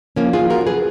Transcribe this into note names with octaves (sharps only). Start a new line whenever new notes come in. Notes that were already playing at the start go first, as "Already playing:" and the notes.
F3 A#3 C#4
F4 G#4
F3
F#4 A#4
F3
G#4 B4